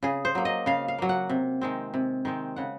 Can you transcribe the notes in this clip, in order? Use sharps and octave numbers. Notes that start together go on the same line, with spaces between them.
C#3 G#4
C5
F#3 A#3
D#5
C#3 F5
F5
F#3 A#3
F#5
C3
D#3 G#3 C4
C3
D#3 G#3 C4
C#3 F#5